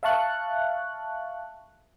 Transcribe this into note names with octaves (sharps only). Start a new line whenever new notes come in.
E5 F5 A5 C#6 F#6